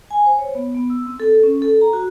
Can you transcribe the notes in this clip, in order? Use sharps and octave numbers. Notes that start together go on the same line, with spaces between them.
G#5
C5
C#5
B3
B3
E6
C4
A4
C#4
A4
A#5
F#4